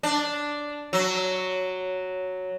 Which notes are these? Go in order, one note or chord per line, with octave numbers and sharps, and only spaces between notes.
D4
F#3